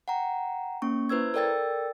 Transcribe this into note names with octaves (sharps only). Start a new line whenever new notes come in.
F#5 G5 A#5
A#3 C#4 C#6
E4 B4 C5 E6 G#6
A4 A#4 D5 G5 E6 A6